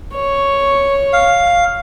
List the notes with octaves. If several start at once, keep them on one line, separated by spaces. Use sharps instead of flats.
C#5
F5